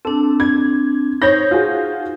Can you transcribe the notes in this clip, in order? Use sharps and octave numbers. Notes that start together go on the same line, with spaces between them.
C4 D4 A4
G#6
D#4 C5 C#5 G6 A#6
F4 F#4 G#4